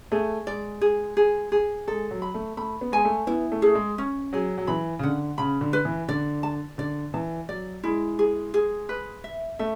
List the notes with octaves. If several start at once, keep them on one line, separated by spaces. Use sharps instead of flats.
A3 G#4
G#3 D5
G#4
G#4
G#4
G#3 A4
F#3
B5
A3
A3 B5
B3
G#3 G#5
A3
B3 E4
A3
A3 G#4
G#3
C#4
F#3 G#4
F#3
E3 B5
C#3
D3 F#5
C#3 B5
D3
B4
E3
D3 D5
A5
D3 D5
E3 A5
F#3 D5
G#3 E4
G#4
G#4
B4
E5
A3 E5